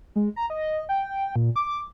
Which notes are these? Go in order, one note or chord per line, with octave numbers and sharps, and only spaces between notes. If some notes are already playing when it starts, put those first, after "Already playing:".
G#3
A#5
D#5
G5
A#2
D6